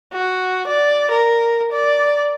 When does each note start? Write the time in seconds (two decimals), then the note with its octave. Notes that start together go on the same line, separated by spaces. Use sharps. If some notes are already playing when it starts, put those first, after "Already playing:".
0.13 F#4
0.68 D5
1.11 A#4
1.72 D5